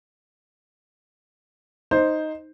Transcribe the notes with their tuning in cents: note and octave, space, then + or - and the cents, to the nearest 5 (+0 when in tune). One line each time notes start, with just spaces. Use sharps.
D#4 +0 C5 +0